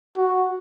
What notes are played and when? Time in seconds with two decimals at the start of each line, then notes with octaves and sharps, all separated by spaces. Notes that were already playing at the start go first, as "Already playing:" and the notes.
0.17 F#4